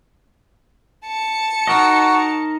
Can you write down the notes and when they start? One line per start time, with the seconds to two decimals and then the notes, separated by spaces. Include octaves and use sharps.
1.07 A5 C#7
1.67 D#4 F#4 A#4 D#5